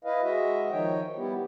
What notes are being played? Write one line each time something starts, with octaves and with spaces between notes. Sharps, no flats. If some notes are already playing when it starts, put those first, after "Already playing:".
E4 B4 D#5 F5
G#3 F#4 D#5 E5
D#3 F3 D#4 C#5 G5
G3 B3 E4 G4